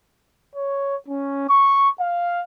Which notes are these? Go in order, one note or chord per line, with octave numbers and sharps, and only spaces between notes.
C#5
C#4
C#6
F5